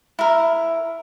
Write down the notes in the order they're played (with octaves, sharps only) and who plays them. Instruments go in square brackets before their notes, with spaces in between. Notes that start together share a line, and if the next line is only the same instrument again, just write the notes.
[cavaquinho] E4 A#4